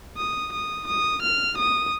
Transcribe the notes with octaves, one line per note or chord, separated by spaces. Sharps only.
D#6
D#6
D#6
F6
D#6